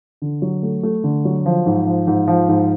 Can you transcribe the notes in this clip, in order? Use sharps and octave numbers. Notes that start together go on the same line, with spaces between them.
D3
F#3
A3
A3
D3
F#3
F3
G#2
F3
G#2
F3
G#2